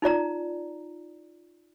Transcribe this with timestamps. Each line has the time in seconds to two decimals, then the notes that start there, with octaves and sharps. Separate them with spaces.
0.02 D#4 F4 D5 A#5